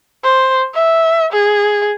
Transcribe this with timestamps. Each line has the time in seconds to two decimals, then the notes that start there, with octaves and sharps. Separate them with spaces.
0.24 C5
0.74 E5
1.33 G#4